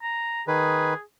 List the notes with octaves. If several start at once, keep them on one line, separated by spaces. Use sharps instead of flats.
A#5
D#3 G#4 B4